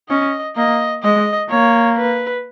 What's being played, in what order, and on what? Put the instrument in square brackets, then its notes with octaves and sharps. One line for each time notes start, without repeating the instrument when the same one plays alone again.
[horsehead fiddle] C#4 [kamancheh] D#5
[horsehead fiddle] A#3 [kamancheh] D#5
[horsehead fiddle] G#3 [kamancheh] D#5
[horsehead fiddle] A#3 [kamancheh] C#5
[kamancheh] B4